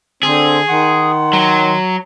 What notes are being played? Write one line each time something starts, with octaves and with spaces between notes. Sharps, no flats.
D3 C4 G#4
D#3 F#5 C6
F#3